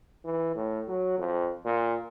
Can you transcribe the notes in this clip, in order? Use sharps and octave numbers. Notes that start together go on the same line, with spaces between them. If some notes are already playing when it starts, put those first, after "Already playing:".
E3
A2
F#3
F2
A#2